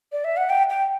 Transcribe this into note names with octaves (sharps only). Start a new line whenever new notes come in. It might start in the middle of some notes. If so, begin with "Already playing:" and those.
D5
E5
F#5
G5
G5